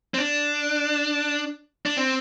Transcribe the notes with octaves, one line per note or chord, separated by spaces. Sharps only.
C4
D4
D4
C4